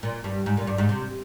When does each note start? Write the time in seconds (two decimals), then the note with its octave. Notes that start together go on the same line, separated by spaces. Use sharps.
0.03 A#2
0.24 G2
0.46 G#2
0.57 A#2
0.67 G2
0.78 G#2
0.89 C3